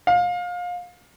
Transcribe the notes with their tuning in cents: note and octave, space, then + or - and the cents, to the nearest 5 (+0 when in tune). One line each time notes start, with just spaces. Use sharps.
F5 +25